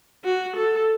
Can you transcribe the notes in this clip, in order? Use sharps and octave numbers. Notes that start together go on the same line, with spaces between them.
F#4
A4